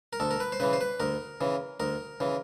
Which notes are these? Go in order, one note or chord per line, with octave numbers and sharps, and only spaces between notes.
A#4
D2 A4
A#4
B4
C5
C#3 E3 B4
C5
B4
D2 A#4
C#3 E3
D2 A#4
C#3 E3